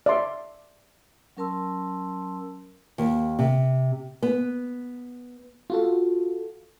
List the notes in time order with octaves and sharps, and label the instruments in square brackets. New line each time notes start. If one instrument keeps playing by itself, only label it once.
[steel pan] D5 E5 C6
[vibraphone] F#3 C#4 A#4 A5 C6 E6
[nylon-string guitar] D#2
C3
B3
[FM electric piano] F4 F#4 A4